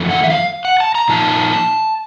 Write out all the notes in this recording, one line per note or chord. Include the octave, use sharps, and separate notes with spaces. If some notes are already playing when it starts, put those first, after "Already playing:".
Already playing: F#2 D3 F3 A3
F#5
E5
F5
F#5
A5
A#5
A#2 F3 A#3 D#4 A5